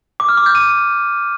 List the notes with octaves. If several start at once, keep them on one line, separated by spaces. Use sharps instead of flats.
D6
F6
D6
G6
D#7